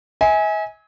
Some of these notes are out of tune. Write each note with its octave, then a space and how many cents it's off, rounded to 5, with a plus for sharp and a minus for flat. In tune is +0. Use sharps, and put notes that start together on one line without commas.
E5 -45 G#5 +0